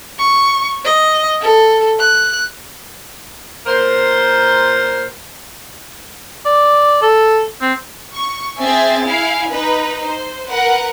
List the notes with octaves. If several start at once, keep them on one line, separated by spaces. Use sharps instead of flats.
C#6
D#5
A4
F#6
A#2 A#4 C5
D5
A4
C4
C#6
C4 G#4 E5 G#5 A6
E4 F5 G#5
D#4 B4
C5
A#4 B4 F#5